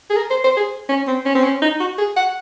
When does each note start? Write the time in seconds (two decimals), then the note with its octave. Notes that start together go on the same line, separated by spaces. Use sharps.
0.10 G#4
0.16 A#4
0.30 C5
0.44 C5
0.57 G#4
0.89 C#4
1.07 C4
1.25 C#4
1.35 C4
1.44 C#4
1.62 D#4
1.80 F#4
1.98 G#4
2.16 F#5